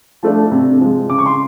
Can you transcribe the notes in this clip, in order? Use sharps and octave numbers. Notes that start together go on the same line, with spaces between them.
F3 A3 D4
C3
F3 G#3
C#3 D6
C#6
C6